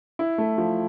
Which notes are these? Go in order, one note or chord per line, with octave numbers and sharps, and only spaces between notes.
E4
A3
F3